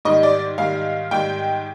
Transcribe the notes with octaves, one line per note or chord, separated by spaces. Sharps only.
G#2 D#3 G3 D#5
D5
G#2 D#3 G3 F5
G#2 D#3 G3 G5